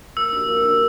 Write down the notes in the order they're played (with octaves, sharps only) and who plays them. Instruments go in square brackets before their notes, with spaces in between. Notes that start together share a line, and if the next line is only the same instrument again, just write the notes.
[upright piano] A#3 [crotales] E6
[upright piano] D4 G4
A#3
D4 G4